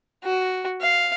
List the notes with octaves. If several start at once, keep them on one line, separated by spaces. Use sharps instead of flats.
F#4
F5